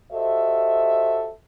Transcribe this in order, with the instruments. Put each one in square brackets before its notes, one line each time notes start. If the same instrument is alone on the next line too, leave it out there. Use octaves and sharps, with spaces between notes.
[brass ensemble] F#4 G4 A4 C5 D#5 E5